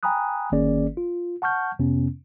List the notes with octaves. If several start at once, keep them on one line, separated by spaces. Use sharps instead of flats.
G5 G#5 A#5 B5 D#6 F#6
G1 D#3 A#3 C#4 G#4 D5
F4
F#5 A5 C#6 F6 G6
F2 C3 B3 C#4